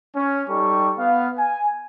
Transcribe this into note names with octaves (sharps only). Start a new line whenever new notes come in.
C#4
G3 D#4 G4 A4 C#6
B3 F5
G#5